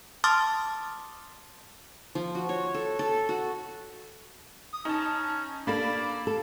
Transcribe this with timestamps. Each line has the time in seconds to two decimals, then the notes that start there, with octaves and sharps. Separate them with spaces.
0.24 A5 C6 D6 D#6 F6 A6
2.15 F3
2.35 F#4
2.49 C#5
2.74 A4
2.99 A4
3.29 F#4
4.73 D#6
4.85 C#4 D#4 A5
5.67 A#3 D4 A4 D5 B5
6.27 A4